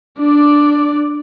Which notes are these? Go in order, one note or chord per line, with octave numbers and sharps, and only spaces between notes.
D4 D5